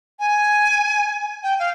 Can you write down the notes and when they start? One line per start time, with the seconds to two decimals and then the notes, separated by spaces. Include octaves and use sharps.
0.20 G#5
1.43 G5
1.59 F5